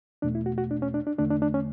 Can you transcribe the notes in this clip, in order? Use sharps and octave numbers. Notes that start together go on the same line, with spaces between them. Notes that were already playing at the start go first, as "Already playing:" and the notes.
E2 B2 A3 D4
E4
F#4
F#4
D4
C#4
D4
D4
E2 D3 A3 D4
D4
D4
C#4